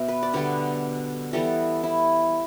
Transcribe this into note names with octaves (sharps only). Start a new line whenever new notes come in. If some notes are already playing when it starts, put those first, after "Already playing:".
Already playing: B2 B3 E5
B4
D5
D3 G3 B3 B4
E3 G3 B3 A4
E4